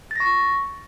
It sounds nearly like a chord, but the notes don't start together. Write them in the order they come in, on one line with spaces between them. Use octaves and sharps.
A6 A#6 C#6